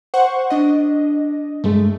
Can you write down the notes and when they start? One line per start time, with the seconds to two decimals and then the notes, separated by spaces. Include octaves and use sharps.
0.14 C5 F#5 C#6
0.50 D4 D#5
1.64 G2 G#3 A3